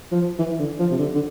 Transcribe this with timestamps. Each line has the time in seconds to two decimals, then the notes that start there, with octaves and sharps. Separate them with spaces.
0.12 F3
0.39 E3
0.60 D3
0.79 F3
0.91 C3
0.99 D3
1.15 D3